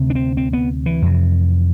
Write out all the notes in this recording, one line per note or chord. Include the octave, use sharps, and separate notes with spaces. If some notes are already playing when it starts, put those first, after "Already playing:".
Already playing: D2 C3
D4
C4
C4
B3
E3
F2 C3